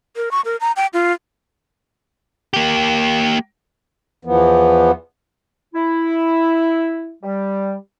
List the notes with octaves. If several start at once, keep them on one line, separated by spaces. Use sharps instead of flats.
A#4
C#6
A#4
A#5
G5
F4
A#3 G4
E2 E3 F3 B3
E4
G3